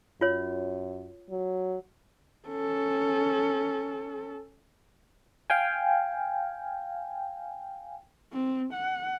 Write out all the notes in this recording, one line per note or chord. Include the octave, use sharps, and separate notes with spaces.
F#2 F4 C#5
F#3
C#4 A4
F5 G5 G#5
C4
F#5